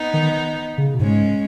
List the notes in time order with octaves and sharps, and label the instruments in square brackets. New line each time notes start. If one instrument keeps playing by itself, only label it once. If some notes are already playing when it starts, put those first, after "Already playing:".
Already playing: [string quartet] B3 D#4
[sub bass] D#3
C#3
B2
[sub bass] G#2 [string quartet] G#3 C#4